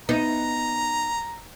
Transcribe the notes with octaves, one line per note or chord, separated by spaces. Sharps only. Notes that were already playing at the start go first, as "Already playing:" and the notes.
B3 D#4 A#5